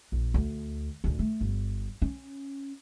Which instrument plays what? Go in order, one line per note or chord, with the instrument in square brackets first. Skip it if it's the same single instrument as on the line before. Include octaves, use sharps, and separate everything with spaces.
[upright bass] A#1
D2
D2 C#3
A3
G1
C#4